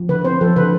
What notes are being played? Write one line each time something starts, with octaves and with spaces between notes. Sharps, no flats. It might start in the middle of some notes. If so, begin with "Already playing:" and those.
Already playing: F3
D3 B4
C4 C5
F3 A4
D3 B4